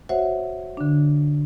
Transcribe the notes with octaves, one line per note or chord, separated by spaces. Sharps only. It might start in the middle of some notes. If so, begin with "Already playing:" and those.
F#4 C5 C#5 E5 F#5
D3 D4